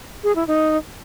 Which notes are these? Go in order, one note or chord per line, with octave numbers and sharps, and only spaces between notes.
G#4
E4
D#4